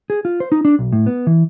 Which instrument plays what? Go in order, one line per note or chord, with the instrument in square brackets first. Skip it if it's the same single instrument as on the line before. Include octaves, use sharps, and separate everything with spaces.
[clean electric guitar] G#4
F4
C5
D#4
D4
B1
A2
B3
E3